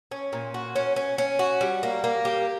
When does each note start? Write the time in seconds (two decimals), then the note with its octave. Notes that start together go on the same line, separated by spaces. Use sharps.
0.11 C#4
0.33 A#2
0.54 F#4
0.76 C#4
0.96 C#4
1.18 C#4
1.39 F#4
1.61 G3
1.83 A#3
2.04 A#3
2.25 G4